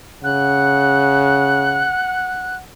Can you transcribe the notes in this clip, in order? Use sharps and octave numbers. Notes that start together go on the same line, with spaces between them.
C#3 F#5 F#6